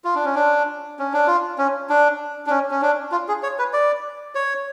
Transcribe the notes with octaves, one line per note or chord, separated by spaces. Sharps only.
F4
D4
C#4
D4
C#4
D4
F4
C#4
D4
D4
C#4
C#4
D4
F4
G#4
C#5
B4
D5
C#5